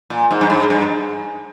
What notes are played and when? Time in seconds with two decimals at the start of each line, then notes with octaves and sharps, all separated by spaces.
0.10 A#2
0.31 G#2
0.41 G2
0.50 G#2
0.70 G2